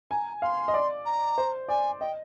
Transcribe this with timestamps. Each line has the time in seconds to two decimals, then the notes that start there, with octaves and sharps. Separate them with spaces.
0.11 G#5 A#5
0.42 F5 C6
0.68 D#5
0.74 D5
1.06 A#5
1.38 C5
1.68 D5 G#5
2.01 D#5 G5